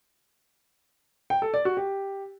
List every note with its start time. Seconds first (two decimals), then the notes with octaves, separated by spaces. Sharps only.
1.30 G5
1.42 A4
1.54 D5
1.65 F#4
1.77 G4